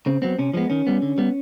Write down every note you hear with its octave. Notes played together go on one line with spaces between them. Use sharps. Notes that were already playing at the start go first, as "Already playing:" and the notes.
C#3 C4
F#3 B3 C4
C3 C#4
F3 G#3 B3 C#4
D#3 C#4
G3 B3
D3
G3 B3